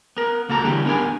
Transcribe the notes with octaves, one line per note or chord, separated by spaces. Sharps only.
B3 A#4
C#2 A#3 F#4 A4 A#5
D3 E3 G3 C#4 G4
B3 D4 G4 A#4 D#5 G#5